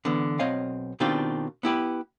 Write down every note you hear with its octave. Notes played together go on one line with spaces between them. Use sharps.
D3 E3 B3
B1 C4 C#5 D#5 F5
B2 D#3 C4 D4 F4 G4
B3 E4 G4 B4